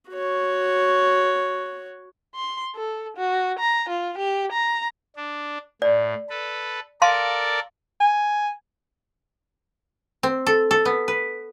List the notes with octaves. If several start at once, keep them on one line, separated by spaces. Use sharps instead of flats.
F#4 C#5
C6
A4
F#4
A#5
F4
G4
A#5
D4
A2 D5
A4 B4
A4 A#4 D5 F5 A5 C6
G#5
C4
A4
A4
B3
B4